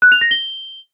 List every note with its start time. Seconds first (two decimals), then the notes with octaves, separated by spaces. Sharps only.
0.02 F#6
0.12 F7
0.21 A#6
0.31 G7